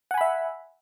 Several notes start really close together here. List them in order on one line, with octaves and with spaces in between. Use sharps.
F#5 G#5 B5 E5